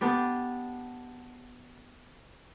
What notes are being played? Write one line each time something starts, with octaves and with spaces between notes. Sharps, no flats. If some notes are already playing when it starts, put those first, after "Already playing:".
B3 D4 G4